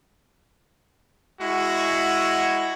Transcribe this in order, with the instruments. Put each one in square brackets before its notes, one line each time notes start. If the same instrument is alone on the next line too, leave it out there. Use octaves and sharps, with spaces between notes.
[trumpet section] G#3 E4 F#4